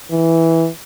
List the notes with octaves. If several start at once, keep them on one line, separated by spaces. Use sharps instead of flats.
E3